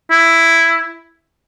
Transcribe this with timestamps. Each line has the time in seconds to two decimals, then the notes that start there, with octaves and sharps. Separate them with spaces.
0.11 E4